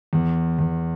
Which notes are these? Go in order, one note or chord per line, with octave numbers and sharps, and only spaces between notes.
E2
E2